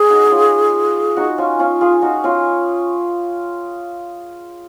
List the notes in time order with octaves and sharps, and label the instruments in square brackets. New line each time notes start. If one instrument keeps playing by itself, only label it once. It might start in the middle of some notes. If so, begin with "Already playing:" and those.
Already playing: [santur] C#4 [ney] G#4
[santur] D#4 F#4
D#4
C#4 F4
D#4 F#4
C#4 F4
C#4 F4
F4 G#4
D#4 F#4
C#4 F4